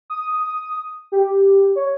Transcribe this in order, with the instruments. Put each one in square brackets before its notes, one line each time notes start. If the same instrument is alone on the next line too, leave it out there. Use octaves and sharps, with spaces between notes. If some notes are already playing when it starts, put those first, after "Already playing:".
[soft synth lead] D#6
G4
C#5